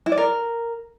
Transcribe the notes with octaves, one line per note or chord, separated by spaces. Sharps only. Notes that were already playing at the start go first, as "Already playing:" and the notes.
E4
D5
A#4